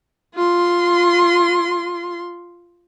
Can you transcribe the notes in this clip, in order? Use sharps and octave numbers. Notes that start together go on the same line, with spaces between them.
F4 C6